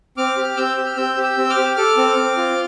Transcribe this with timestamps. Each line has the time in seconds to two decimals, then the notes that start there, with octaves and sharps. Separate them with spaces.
0.17 C4 D6 F6
0.37 G4
0.57 C4 E6 G6
0.77 G4
0.86 F6
0.97 C4 E6 G6
1.17 G4
1.23 E6 G6
1.37 C4
1.50 D6 F6
1.57 G4
1.76 A4 D6 F6
1.97 C4
2.16 C4
2.37 F4